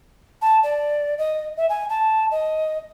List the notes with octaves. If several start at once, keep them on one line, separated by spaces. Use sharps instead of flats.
A5
D5
D#5
E5
G#5
A5
D#5